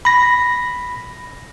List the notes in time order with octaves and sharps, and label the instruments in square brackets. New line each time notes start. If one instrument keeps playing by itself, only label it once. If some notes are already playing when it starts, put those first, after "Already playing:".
[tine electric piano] B5 A#6